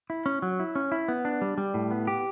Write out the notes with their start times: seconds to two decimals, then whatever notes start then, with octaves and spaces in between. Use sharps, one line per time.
0.10 E4
0.26 C#4
0.42 F#3
0.60 E4
0.75 C#4
0.92 E4
1.08 B3
1.25 D4
1.41 G3
1.58 G3
1.74 A2
1.91 B3
2.07 G4